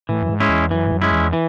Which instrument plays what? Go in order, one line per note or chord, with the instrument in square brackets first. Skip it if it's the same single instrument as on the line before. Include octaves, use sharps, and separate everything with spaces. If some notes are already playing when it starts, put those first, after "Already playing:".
[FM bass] A2 [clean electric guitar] E3
[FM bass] F#2
G#2
[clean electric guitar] G#3 C#4 E4
[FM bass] E2
[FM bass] F#2 [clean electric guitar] E3
[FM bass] G#2
F#2
[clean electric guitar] G#3 C#4 E4
[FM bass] E2
[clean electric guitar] E3